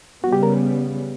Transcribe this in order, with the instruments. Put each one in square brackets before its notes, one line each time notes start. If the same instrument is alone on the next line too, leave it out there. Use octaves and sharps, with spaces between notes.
[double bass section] C#3 G3 B3 [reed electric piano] F#4
[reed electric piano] G4
A#4